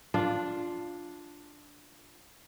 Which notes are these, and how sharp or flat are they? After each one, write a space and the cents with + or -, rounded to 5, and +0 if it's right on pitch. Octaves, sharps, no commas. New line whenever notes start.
D4 +0 F4 +0 D5 +0